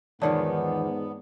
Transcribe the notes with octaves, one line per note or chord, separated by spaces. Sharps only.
E2 G#2 D#3 F3 B3 C#5 D5 A5